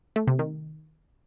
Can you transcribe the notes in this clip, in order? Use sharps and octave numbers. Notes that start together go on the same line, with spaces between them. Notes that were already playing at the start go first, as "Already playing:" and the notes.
A3
C3
D#3